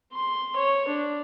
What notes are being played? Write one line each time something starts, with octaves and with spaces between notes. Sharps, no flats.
C6
C#5
D4